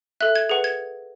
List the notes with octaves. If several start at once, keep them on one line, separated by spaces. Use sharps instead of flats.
A4 E5 F#6
G#6
G#4 B4 F#5
G#6